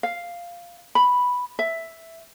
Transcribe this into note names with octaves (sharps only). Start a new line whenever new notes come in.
F5
B5
E5